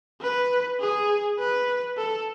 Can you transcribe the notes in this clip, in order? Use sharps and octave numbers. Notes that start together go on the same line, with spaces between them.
B4
G#4
B4
A4